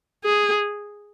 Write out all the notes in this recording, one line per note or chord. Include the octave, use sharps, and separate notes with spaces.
G#4